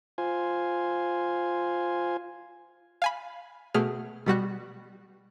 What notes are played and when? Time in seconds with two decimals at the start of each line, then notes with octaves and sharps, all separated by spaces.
0.18 F4 C5 G#5
3.02 F5 G#5 B5
3.74 B2 A3 G#4 F6
4.26 B2 G3 F#4 F#6